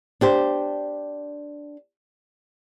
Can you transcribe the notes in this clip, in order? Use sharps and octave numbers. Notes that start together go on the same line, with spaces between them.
D4 G4 C5